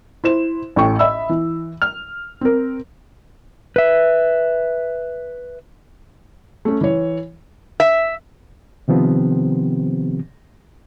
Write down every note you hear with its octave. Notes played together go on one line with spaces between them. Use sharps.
E4 C5 E7
A1 A2 G5 C#6
D#5 E5 B5 E6
E3
F6
C4 A#4
B4 E5
A3 C#4
E3 C#5
E5
C3 D#3 F3 B3 C4 G4